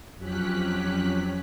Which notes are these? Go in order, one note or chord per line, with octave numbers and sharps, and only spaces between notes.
F2 F#3 C#4 G4 F#6 B6